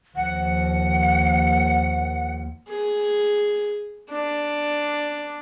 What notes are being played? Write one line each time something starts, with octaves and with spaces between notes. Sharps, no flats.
D#2 F3 F#5
G#4
D4